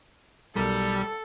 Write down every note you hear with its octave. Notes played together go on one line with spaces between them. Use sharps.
B1 G3 A4 A#4